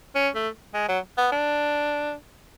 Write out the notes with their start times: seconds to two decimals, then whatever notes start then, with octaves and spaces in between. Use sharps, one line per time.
0.15 C#4
0.35 A3
0.74 G#3
0.88 F#3
1.18 B3
1.32 D4